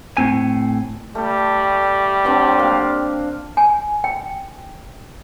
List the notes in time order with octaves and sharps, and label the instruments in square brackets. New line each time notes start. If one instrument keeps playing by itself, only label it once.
[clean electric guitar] A2 C4 G#5
[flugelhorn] G3 [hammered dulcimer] A3
[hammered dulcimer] F#3 C4 D4
A#3 F5
[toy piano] G#5
G5